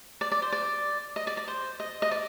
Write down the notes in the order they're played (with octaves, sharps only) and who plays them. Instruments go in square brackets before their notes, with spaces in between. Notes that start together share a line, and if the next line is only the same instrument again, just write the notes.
[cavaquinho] D5
D5
C5
D5
D#5
D5
D5
C5
D#5
D#5
D5